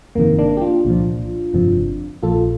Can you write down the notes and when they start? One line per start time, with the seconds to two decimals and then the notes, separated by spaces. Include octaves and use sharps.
0.15 G1 F2 C3 D#3 A#3
0.39 A#3 D4
0.57 G4
0.61 D4 F4
0.85 C2 A#2 F3
1.54 G1 F2 C3 F3
2.23 A#1 A#2 F3 F4 A4